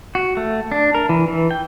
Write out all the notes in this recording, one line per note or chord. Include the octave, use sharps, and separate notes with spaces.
F#4
A3
D4
A#4
E3
E3
G5